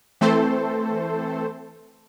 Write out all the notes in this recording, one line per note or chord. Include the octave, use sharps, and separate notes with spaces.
E3 A3 C4 A4 C5